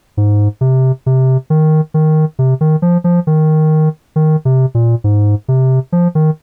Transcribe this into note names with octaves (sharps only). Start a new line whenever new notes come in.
G#2
C3
C3
D#3
D#3
C3
D#3
F3
F3
D#3
D#3
C3
A#2
G#2
C3
F3
D#3